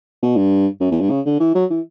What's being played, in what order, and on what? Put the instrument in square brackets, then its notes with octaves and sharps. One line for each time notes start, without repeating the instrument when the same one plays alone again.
[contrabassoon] B2
G2
F#2
E2
G2
C#3
D3
E3
F#3
E3